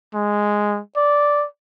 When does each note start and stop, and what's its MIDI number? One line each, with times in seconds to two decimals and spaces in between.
0.15 0.79 56
0.97 1.46 74